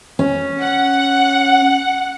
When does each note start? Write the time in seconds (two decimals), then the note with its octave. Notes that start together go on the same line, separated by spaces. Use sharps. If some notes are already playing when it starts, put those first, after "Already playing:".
0.19 C#4
0.63 F#5